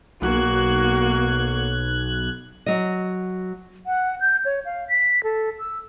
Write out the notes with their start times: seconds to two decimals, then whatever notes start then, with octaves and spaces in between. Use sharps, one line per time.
0.22 B1 A#3 F#4 F#6 G#6
2.66 F#3 D#5
3.86 F#5
4.20 G6
4.45 C#5
4.65 F5
4.89 B6
5.24 A4
5.59 E6